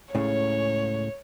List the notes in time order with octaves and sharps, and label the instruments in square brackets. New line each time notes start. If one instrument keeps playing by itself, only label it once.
[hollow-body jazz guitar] C#2 A2 C#3 [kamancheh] C#5